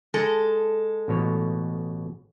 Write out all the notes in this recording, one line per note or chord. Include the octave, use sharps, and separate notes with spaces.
G#3 A4
A1 B2 C#5